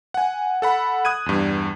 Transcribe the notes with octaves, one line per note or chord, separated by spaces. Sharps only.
F#5 G#5
A4 F#5 B5
D#6 F#6 G#6 D#7
E2 G2